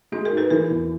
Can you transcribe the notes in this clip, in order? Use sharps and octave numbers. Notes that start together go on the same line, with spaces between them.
G#3 F#4 G#4
G#4 A#4
G#2
A4 B4
E3 G#4 A#4
E2